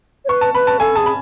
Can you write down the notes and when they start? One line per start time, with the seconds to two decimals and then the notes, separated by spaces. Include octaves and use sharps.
0.25 C#5
0.28 B4 C#6
0.41 A5
0.54 B4 B5
0.67 A5
0.80 A4 G#5
0.95 G#4 A5
1.06 B5